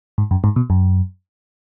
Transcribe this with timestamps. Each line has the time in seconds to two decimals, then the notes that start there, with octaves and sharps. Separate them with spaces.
0.18 G#2
0.31 F#2
0.44 G#2
0.56 B2
0.70 F#2